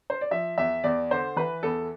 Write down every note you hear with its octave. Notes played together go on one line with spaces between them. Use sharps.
C5
D5
F3 E5
E2 E5
E2 D5
D3 C5
E3 B4
E2 A4